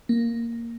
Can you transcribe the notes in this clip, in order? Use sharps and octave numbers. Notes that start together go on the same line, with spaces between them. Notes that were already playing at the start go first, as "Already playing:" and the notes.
A#3